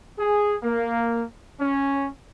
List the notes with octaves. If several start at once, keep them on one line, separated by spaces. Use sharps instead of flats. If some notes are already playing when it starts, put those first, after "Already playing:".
G#4
A#3
C#4